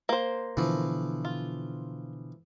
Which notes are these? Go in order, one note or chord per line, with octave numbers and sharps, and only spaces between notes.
A#3 C5
B2 D3 E3 F3
F4